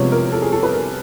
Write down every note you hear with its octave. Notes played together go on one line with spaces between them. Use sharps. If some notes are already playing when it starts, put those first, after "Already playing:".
Already playing: C2 C3 F3 G#3 B3 C#5
A#4
A4
G#4
A4
B4
A#4